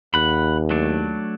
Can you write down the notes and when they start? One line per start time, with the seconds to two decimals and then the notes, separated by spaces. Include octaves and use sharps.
0.14 D#2 F#5 B5
0.70 F#3 A3 D4